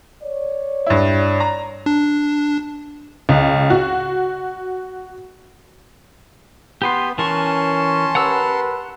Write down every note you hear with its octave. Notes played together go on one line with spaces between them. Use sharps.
C#5 D5
G2 E4
A#5
D4
C#2
F#4
B3 G4 B4 C6
E3 C#4 A#4 A5 C6 C#6
G4 A#4 B4 F#5 A#5 E6